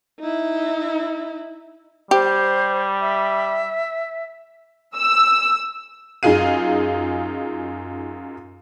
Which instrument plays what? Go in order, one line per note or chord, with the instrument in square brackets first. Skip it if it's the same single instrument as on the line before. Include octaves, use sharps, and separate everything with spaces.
[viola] D#4 E4
[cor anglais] G3 [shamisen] G4 [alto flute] C5
[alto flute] E5
[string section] E6
[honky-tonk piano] F#2 D#4 F4 G#4 F5 D#7